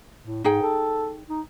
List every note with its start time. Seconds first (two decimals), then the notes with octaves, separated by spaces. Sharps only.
0.24 A2
0.44 G#2 D#4 G#4 G5
0.62 A4
1.29 D#4